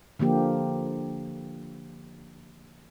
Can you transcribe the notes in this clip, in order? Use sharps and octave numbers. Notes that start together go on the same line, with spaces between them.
D3 F3 A#3 G4